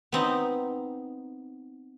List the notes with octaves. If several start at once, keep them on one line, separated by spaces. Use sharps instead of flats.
B3 C4 D#4